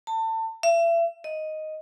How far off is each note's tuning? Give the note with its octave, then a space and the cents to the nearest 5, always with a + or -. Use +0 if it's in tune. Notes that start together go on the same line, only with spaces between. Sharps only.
A5 +30
E5 +35
D#5 +0